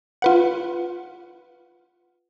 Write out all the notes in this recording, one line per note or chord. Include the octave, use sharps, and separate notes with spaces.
F4 B4 F#5